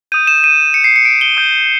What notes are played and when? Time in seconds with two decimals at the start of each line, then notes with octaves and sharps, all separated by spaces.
0.12 D#6 G6 D#7
0.27 E7
0.44 D#7
0.74 C#7
0.84 C7
0.96 C#7
1.05 D7
1.21 G7
1.37 D#6 G6